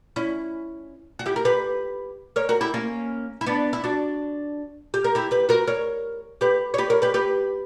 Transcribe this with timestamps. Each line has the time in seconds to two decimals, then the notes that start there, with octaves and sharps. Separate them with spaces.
0.16 C#4 E4
1.19 F#4
1.26 E4 G4
1.36 A#4
1.45 G4 B4
2.36 A#4 C#5
2.49 F#4 A#4
2.61 E4 G4
2.74 A#3 C#4
3.41 E4
3.46 B3 D4
3.73 E4
3.84 D4 F#4
4.94 G4
5.04 A#4
5.15 E4 G4
5.31 G4 B4
5.49 F#4 A#4
5.67 A#4 C#5
6.41 G4 B4
6.74 C#5
6.78 G4 B4
6.90 A#4 C#5
7.02 G4 B4
7.14 G4 B4